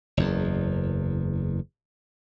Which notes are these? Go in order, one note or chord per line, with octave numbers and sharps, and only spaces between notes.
F#1 E2